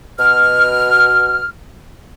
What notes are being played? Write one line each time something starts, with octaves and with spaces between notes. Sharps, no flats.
B2 F6